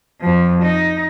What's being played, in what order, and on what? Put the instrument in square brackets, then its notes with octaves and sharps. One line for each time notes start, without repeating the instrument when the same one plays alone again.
[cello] F2 F3
D#4